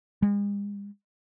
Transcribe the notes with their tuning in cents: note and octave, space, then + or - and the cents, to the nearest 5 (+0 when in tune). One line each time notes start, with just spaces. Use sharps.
G#3 -45